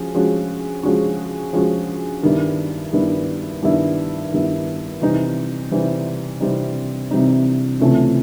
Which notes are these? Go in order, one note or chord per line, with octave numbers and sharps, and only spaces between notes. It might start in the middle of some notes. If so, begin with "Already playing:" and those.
Already playing: F3 G#3 C#4 F#4
F3 G#3 C#4 F#4
F3 G#3 C#4 F#4
F3 G#3 C#4 F#4
G2 D#3 G3 B3 E4
G2 D#3 G3 B3 E4
G2 D#3 G3 B3 E4
G2 D#3 G3 B3 E4
C3 E3 G3 C4 D#4
C3 E3 G3 C4 D#4
C3 E3 G3 C4 D#4
C3 E3 G3 C4 D#4
C#2 C3 E3 A3 C#4